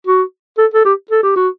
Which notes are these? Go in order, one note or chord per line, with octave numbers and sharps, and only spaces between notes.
F#4
A4
A4
G4
A4
G4
F#4